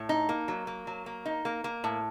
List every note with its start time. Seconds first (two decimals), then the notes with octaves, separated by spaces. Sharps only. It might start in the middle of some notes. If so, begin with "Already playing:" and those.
Already playing: A2
0.09 D#4
0.29 A#3
0.48 F#3
0.67 A#3
0.87 F#3
1.06 A#3
1.26 D#4
1.45 A#3
1.64 A#3
1.84 A2